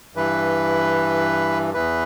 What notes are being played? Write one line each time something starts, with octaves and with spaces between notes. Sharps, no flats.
G2 E3 B4
E2 E3 B4